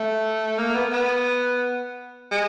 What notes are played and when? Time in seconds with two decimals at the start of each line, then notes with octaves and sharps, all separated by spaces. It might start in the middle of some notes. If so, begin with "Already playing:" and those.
Already playing: A3
0.58 A#3
0.75 B3
0.93 B3
2.31 G#3